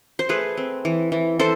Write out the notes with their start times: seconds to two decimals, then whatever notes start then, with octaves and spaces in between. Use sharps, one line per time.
0.19 C5
0.29 A3 G#4 B4
0.57 C4
0.85 E3
1.12 E3
1.39 E3 A4 C5